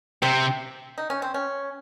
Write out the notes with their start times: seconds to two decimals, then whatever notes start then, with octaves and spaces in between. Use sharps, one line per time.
0.22 C3 C4
0.98 D#4
1.10 C#4
1.22 C4
1.34 C#4